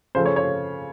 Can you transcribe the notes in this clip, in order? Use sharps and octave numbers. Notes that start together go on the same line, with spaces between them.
C#3 F3 A3 C5
C#5
C#5